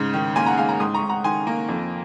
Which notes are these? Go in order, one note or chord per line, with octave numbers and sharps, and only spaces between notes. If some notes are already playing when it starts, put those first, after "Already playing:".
Already playing: G#2 C#3
D#3
A#3 G#5 C6
F#5 A#5
G#2 F5 G#5
F#5 A#5
G#2 C6 D#6
A#5 C#6
G#2
F#5 A#5
D#3 G#5 C6
A#3
F2